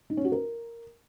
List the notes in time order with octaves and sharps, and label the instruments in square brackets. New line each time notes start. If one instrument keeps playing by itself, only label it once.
[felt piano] D#4
C#4
F#4
A#4